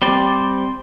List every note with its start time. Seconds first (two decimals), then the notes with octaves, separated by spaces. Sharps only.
0.02 G3 C4 C5 D5